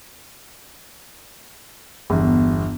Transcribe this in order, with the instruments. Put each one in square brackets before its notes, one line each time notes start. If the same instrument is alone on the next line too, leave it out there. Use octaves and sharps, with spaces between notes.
[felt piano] G1 E2